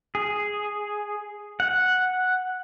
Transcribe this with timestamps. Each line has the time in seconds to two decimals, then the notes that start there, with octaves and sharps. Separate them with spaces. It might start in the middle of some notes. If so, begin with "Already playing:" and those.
0.15 G#4
1.60 F#5